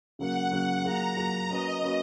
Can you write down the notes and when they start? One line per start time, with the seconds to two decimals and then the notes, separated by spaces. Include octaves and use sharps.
0.19 C#3 F#3 A#3 F#5
0.51 C#3 F#3 A#3
0.84 F#3 A#3 F4 G#4 A#5
1.16 F#3 A#3 F4 G#4
1.49 A#3 C#4 F#4 B4 D#5
1.82 A#3 C#4 F#4 B4